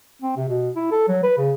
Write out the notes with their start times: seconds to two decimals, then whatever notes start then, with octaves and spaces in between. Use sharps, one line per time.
0.23 C4
0.37 C3
0.48 B2
0.76 E4
0.92 A4
1.08 F#3
1.23 B4
1.38 C#3